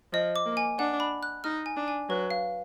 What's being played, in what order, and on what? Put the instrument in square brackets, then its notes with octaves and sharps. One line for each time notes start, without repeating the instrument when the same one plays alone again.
[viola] F3 [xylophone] D#5
[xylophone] D6
[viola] A#3
[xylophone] G#5
[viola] D4 [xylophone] F#5
[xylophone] B5
F#6
[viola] D#4 [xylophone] F6
[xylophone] G#5
[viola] D4
[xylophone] G#5
[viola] F#3 [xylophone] B4
[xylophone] F5